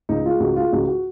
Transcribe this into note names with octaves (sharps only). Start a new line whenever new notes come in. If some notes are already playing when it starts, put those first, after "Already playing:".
C#2 D#4
G#3 F4
C#2 F#4
G#3 F4
C#2 F#4
F#4